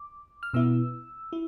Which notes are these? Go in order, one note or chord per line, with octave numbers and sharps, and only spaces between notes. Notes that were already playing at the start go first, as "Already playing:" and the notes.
Already playing: D6
F6
B2 B3 E4 E6
E4